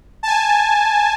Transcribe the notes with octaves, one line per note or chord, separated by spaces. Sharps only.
G#5 A5